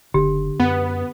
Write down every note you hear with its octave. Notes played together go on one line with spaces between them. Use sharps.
F#1 D3 G4
F#2 B3